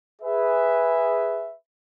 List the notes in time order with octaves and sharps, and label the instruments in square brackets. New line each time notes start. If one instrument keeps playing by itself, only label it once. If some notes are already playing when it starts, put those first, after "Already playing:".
[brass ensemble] G#4 B4 E5